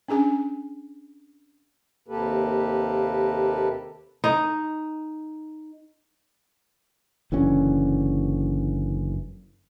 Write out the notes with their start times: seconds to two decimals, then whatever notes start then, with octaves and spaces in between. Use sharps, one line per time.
0.08 C#4 D4 G#4 G#5
2.08 D#2 C3 A#3 G4 A4 B4
4.24 D#4
7.32 F#1 D3 E3 C#4